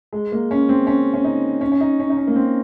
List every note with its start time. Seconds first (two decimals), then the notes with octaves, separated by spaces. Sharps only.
0.13 G#3
0.32 A#3
0.51 C#4
0.69 C4
0.87 C#4
1.14 C#4
1.24 D#4
1.61 C#4
1.72 C#4
1.81 D#4
1.99 C#4
2.10 D#4
2.17 C#4
2.27 A#3
2.36 C4